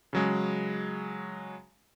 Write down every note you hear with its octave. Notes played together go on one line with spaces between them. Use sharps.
C#3 F#3 G#3